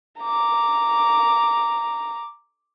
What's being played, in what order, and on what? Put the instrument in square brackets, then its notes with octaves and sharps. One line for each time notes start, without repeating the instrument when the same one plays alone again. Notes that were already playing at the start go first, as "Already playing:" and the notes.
[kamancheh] A#5 D6